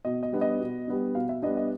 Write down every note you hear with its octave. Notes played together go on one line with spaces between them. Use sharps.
B2 D#5
D#5
G3 B3 D4
D#5
B2
G3 B3 D4
B2 F5
E5
G3 B3 D4 D#5
D#5